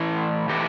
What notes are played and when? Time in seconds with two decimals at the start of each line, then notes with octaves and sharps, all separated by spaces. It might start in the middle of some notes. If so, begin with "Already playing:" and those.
Already playing: A2 E3
0.49 A2 E3 G4